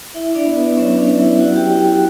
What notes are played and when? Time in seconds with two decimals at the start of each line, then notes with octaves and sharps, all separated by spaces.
0.14 E4 E5
0.35 D4 D5
0.46 B3
0.56 B3 B4
0.77 F#3 C#4 C#5
0.98 D4 D5
1.09 F#3
1.19 E4 E5
1.40 E4 F#4 F#5
1.56 G4 G5
1.71 E4 G4 G5
1.87 F#4 F#5